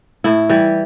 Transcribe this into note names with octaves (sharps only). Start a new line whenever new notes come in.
A2 E4
E3 G3